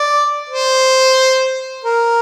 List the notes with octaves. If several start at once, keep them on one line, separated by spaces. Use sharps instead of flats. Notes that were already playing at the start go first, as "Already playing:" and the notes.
Already playing: D5
C5
A#4